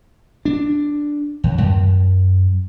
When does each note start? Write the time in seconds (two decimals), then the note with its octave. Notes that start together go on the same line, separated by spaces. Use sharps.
0.45 D4
1.44 D#2
1.58 F#2